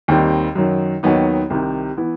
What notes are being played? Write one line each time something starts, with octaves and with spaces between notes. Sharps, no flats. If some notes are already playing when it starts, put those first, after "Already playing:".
D#2 D#3 G3 C4
F#2 D#3 F#3
D#2 D#3 F#3 B3 D#4
C2 C3 D#3
E3 B3 E4